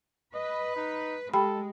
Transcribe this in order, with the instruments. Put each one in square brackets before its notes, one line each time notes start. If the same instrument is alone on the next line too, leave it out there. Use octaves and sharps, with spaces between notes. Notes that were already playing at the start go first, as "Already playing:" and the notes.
[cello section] B4 [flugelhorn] D#5
[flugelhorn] D#4
[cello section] G#3 [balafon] G4 G5 B5 [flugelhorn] A4